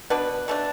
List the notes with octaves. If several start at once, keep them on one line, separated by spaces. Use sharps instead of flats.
B2 B3 D4 B4
B2 A3 D4